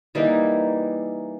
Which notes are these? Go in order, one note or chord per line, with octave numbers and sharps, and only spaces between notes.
E3 G3 A#3 D#4